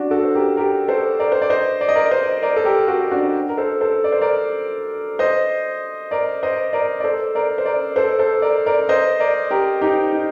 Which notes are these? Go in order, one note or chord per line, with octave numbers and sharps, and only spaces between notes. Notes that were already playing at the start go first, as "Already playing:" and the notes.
Already playing: D4 F#4
F#4 A4
C5
G4 A#4
G4 A#4
A4 C5
A#4 D5
C5
D5
C5 D#5
D5
D#5
A#4 D5
C5 D#5
A#4 D5
A4
G4 A#4
F#4 A4
D4 F#4
A#4
A4 C5
A4 C5
D5
C5
A#4 D5
C5 D#5
A#4 D5
C5 D#5
A#4 D5
D5
A4 C5
A#4 D5
C5
A#4 D5
A4 C5
A4 C5
A#4 D5
A#4 D5
C5 D#5
A#4 D5
G4 A#4
D#4 G4
D#4